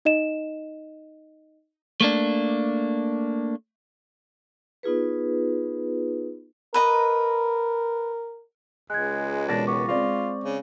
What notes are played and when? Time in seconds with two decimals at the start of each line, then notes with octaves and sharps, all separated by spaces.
0.05 D#4 D#5 E7
2.01 A3 A#3 D4
4.83 B3 D#4 F4 G#4 B4
6.74 A#4 B4 D#5 A#5
8.90 C#2 G#3 F#6 G#6
9.48 E1 D4 A6 A#6
9.67 B3 C#6 D6
9.88 G#3 C4 F4 D5
10.44 C#3